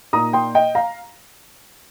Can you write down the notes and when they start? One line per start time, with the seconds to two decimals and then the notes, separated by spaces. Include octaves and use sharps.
0.13 A#2 A#3 D#4 A#5 D#6
0.33 G5 C6
0.55 D#5 G5
0.75 F5 A#5